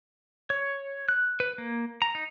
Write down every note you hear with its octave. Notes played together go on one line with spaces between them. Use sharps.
C#5
F#6
B4
A#3
A#5
D#4